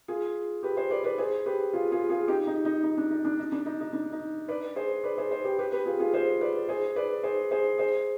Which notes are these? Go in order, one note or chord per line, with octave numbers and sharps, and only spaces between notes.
F4 G#4
G4 B4
G#4 C5
B4 D5
B4 D5
G#4 C5
G4 B4
F4 G#4
F4 G#4
F4 G#4
D#4 G4
D#4
D#4
D#4
D4
D#4
D4
D#4
D4
D#4
D#4
D4
D#4
B4 D5
G#4 C5
B4 D5
G#4 C5
G#4 C5
G4 B4
G4 B4
G4 B4
F4 G#4
F4 G#4
G#4 C5
B4 D5
G#4 C5
B4 D5
G#4 C5
G#4 C5
G#4 C5